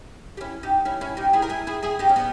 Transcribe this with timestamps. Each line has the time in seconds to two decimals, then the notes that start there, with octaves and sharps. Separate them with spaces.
0.37 G4
0.41 C#4 E4
0.63 D#4 G4
0.85 C#4 E4
1.01 C#4 E4
1.17 D#4 G4
1.33 E4 G#4
1.42 A#4
1.50 E4 G#4
1.67 E4 G#4
1.83 E4 G#4
1.99 D#4 G4
2.09 C#4
2.16 B3 D#4